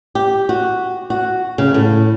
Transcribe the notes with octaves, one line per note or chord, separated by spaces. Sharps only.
G4
F#4
F#4
C#3
A2